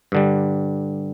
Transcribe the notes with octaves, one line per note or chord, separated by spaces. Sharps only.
G2 D3 G3